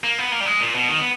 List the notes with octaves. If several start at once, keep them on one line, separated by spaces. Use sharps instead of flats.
A#3
B3
A#3
G3
G#3
A#2
B2
D#3
B3